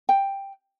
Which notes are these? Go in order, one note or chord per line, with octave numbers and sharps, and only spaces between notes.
G5